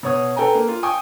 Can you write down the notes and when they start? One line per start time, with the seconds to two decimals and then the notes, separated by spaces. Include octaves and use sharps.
0.03 B2 C#5 D#6
0.36 A4 B4 G5 G#5 A#5
0.55 A#3
0.68 F4
0.83 G5 G#5 C#6 D#6